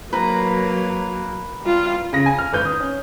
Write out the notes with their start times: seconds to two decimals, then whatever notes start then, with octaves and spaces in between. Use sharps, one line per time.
0.13 F#3 A#3 B4 A#5
1.63 G3 F4
2.13 C#3 A#6
2.26 G#5
2.38 F6
2.53 G#1 B4 G6
2.65 D#6
2.80 C#4